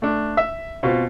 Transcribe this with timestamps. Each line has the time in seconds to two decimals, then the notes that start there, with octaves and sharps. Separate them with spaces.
0.02 A3 D4
0.37 E5
0.83 B2 C4 F4